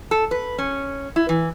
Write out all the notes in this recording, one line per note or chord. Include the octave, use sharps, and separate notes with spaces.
A4
B4
C#4
E4
E3